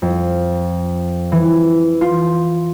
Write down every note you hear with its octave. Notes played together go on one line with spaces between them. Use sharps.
F2
E3
F4